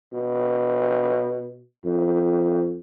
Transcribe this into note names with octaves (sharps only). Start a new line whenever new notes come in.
B2
F2